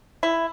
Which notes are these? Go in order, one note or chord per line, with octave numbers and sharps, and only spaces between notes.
E4